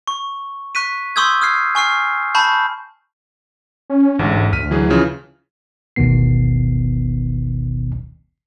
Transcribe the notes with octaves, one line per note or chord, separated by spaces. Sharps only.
C#6
C#6 F#6 B6 D#7
C6 C#6 D#6 E6 G6 G#6
D#6 F6 G#6 C7
G#5 C#6 F6 C7
A5 B5 C#6 G6
C#4
A1 D2 G#2
D2 F6 B6 D#7
E3 F#3 G#4
C#3 E3 F3
G1 D2 B2 D#3 B3 C7